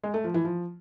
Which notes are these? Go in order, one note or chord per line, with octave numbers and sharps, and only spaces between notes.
G#3
A3
F3
E3
F3